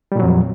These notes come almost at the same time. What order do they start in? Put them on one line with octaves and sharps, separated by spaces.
G3 A#2 F#3 F2